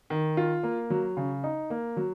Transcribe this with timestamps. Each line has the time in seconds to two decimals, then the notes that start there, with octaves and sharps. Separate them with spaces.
0.10 D#3
0.37 F4
0.63 A#3
0.90 F#3
1.17 C#3
1.44 D#4
1.70 A#3
1.97 F#3